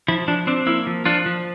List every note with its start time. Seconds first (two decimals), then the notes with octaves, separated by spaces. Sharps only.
0.08 F3 E4
0.28 F3 D4
0.47 C4 D4
0.67 A#3 E4
0.87 F3
1.06 F3 D4 F4
1.26 F3